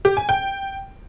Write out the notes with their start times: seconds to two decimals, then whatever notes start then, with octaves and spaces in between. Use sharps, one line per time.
0.05 G4
0.17 G#5
0.29 G5